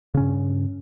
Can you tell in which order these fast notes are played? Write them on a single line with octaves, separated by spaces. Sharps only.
C#3 C#4 G2